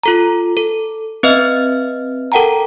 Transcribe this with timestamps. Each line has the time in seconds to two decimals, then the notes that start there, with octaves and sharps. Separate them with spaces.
0.03 F4 A4 A#5
0.57 A4
1.23 C4 B4 D#5 E5 F6
2.32 A4 A#4 F#5 G5 A5 A#5